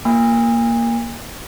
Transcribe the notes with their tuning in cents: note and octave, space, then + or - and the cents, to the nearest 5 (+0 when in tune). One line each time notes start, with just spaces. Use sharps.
A#3 +0 G#5 -40